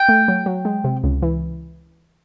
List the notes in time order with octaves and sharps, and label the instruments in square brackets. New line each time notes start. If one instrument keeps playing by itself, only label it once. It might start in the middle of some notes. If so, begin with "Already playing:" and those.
Already playing: [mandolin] G5
[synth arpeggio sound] A3
F#3
F#3
G#3
C3
C#2
E3